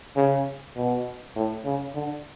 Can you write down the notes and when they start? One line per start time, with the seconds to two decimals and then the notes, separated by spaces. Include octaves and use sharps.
0.16 C#3
0.77 B2
1.36 A2
1.65 C#3
1.95 D3